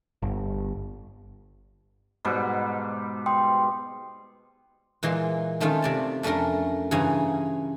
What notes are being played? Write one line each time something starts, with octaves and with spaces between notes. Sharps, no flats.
G1
G#2 B2 G3
G5 C6 D#6
A#2 E3 G#3 A#3 C6
D#3 A3 C4 C#4 F4
C3 D5 A5
F2 A3 C#4 D4 A#4 C6
G2 C#3 E3 C#4 G#5 A#5